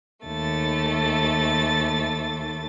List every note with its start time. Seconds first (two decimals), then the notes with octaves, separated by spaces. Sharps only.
0.26 D#2 A3 A6